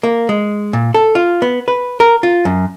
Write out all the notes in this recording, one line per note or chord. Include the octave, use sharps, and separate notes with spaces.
A#3
G#3
A#2
A4
F4
B3
B4
A#4
F4
F#2